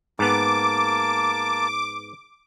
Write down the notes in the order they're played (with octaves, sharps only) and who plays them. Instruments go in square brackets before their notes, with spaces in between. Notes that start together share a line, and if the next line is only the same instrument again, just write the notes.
[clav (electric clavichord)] G#2 B3 [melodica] A#3 A5 [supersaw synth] D6